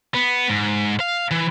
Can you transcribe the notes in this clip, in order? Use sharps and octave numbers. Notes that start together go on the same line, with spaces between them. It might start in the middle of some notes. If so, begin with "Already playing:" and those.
B3
G#2
F5
E3